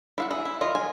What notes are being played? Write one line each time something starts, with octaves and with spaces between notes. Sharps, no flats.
E4 F5 F#5
E4 G#4
E4
D#3 F4 D#5
G#5